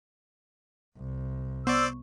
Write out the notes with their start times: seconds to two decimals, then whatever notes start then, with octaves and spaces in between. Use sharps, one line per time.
0.97 C2
1.67 B3 C5 D5 C#6 E6